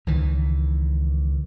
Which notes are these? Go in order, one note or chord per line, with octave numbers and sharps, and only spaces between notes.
C#2 D#3 E3